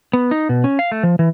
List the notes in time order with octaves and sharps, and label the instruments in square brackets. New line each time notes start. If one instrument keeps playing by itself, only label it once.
[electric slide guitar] B3
D#4
B2
C#4
F5
A3
F3
E3